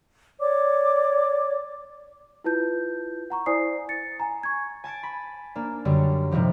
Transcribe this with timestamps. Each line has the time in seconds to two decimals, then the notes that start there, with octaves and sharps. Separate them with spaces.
0.41 C#5 D5 D6
2.44 E4 F4 B4 A5 G6
3.30 F#5 A#5 C#6
3.46 E4 C5 D5 G#5 D#6 C7
3.89 A6 C#7
4.20 G#5 A#5
4.43 C#6 G#6
4.84 G#5 A5 A6 D7
5.03 B5
5.55 A#3 D4
5.85 F#2 D3 G3
6.31 A2 C3 D#3 F3 G3